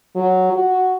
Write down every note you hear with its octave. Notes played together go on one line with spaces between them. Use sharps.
F#3
F#4